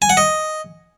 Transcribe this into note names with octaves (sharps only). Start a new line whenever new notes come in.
G#5
F#5
D#5